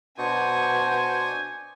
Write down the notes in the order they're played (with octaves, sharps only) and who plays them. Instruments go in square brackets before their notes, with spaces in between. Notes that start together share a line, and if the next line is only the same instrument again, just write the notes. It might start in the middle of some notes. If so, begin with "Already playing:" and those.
[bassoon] B2 [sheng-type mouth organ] D4 C#6 D#6 [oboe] C5 [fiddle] G#5